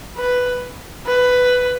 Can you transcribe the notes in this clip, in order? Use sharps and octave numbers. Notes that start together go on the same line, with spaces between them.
B4
B4